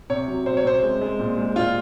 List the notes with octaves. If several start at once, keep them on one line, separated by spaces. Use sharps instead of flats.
C3 C#5
F#3
C3 C5
C#5
C3 C5
G#3
G#3
A#2
G#3
A#2 F4